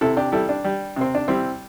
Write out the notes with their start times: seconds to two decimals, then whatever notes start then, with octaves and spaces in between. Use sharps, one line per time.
0.01 C3 E4 A4
0.17 D4 G4
0.32 G3 E4 A4
0.49 D4
0.64 G3
0.96 C3 C4
1.15 D4
1.28 G3 C4 E4